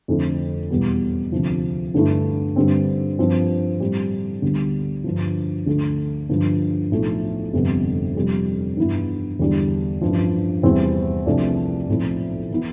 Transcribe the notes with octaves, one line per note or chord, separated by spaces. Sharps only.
F2 D3 A3 C4 E4
E2 B2 G3 B3
D2 C3 F3
G2 D3 A3 E4
G2 D3 G3 C4
G2 F3 C4
A2 G3 C4
D2 D3 G3 B3
G2 D3 F3
D2 D3 A3
G2 D3 F3
B1 A2 F3 A3
G1 F2 C3 G3 B3
F2 C3 G3
G2 E3 B3 E4
E2 D3 G3 D4
A1 G2 F3
E2 C3 G3 C4 E4
C2 C3 F3 A3 D4
B1 A2 F3 C4 E4
E3 B3 E4